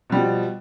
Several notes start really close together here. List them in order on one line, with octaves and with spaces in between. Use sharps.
B2 G3 F3